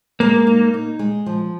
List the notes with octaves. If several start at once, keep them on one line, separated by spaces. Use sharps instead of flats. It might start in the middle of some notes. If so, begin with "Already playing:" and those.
G#3 A#3
D#4
D#4
G#3
F3